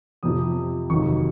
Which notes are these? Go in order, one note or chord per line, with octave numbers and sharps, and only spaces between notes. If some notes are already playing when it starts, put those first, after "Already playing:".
F2 C3 F3 D#6
F1 D#2 D#3 F#3 C#6